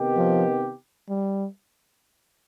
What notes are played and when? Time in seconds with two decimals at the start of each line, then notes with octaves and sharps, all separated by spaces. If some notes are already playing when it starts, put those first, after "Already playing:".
Already playing: C3 D#3 B3 D#4 G4
0.16 F3
1.09 G3